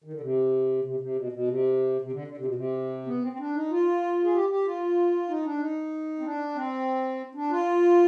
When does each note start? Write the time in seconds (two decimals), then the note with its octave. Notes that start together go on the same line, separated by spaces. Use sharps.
0.04 D#3
0.13 D3
0.21 C3
0.84 C3
1.00 C3
1.16 B2
1.32 B2
1.48 C3
2.01 C3
2.12 D3
2.28 D3
2.37 C3
2.45 B2
2.55 C3
3.06 B3
3.22 C4
3.33 C4
3.39 D4
3.54 D#4
3.71 F4
4.24 G#4
4.34 G4
4.49 G4
4.65 F4
5.29 D#4
5.44 D4
5.60 D#4
6.19 C4
6.24 D4
6.55 C4
7.35 D4
7.51 F4